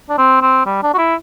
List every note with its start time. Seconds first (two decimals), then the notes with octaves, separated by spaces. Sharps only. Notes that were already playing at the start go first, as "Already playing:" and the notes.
0.10 D4
0.18 C4
0.42 C4
0.66 G3
0.83 D4
0.94 F#4
0.98 E4